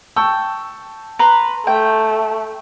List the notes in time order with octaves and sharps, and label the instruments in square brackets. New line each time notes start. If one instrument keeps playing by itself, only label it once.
[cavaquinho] G5 [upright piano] A5 C#6 E6
[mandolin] B4 [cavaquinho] A#5 C6
[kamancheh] A3 [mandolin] G5